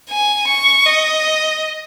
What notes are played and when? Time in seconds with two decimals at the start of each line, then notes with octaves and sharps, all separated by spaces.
0.10 G#5
0.48 C#6
0.86 D#5